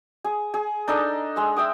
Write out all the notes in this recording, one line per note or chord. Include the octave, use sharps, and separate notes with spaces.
G#4
G#4
D4 D#4 A4 D#5
G#3 E6
E5 G5 D#6